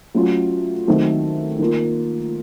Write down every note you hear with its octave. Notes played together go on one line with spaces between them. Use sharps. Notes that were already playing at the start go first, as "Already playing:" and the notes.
F#3 A3 C#4 F4
D#3 F#3 A3 C4
D#3 A#3 F4